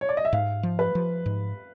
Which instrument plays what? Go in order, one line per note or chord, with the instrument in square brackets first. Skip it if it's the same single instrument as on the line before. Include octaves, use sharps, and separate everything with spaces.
[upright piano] C#5
D5
D#5
E5
[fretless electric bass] G#2 [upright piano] F5
[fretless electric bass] F3
[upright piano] B4
[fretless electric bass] F3
G#2